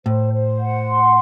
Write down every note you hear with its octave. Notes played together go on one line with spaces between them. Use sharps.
A2 C5
C5
F#5
C6